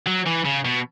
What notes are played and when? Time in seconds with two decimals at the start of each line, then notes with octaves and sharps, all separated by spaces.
0.06 F#3
0.26 E3
0.45 C#3
0.65 B2